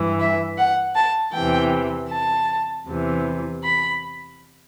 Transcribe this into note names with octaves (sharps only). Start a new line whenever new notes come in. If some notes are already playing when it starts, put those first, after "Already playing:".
Already playing: G2 E3
E5
F#5
A5
E2 C3 E3 G5
A5
E2 C3 E3
B5